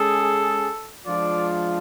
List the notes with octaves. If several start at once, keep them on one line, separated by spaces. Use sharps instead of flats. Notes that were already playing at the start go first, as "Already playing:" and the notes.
Already playing: G#3 C#4 G#4 A4
F3 G#3 D4 F4 D5